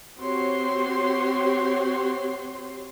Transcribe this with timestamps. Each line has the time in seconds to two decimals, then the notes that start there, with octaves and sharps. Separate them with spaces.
0.19 C4 F#4 G4 C#5 C6